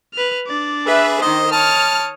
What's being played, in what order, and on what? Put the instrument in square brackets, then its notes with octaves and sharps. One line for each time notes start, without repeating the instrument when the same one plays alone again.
[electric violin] B4 F6
D4 D5
[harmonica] G#4 [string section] B4 E5
[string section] D#3 C5 [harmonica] D#5
[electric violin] C#5 D#6 [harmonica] A5 [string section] F6